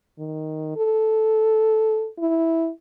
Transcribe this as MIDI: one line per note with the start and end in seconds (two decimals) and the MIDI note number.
0.19 0.75 51
0.76 2.08 69
2.19 2.70 64